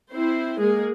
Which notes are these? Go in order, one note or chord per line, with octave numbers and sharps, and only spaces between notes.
C4 E4 C5
G#3 A#3 G#4